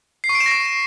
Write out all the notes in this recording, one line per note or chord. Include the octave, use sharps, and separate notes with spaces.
C7
C#6
D7
E7
A#6